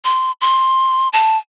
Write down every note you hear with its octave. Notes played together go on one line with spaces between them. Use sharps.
C6
C6
A5